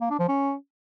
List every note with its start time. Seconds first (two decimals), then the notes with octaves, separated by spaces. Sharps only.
0.01 A#3
0.10 D4
0.19 F3
0.28 C#4